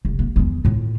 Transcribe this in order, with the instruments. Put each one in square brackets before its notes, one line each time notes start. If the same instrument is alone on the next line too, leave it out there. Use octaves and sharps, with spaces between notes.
[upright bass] F1
A#3
E1 E2
A2 F4